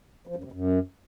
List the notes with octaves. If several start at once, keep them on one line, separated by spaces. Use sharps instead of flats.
F3
F#2
C3
F#2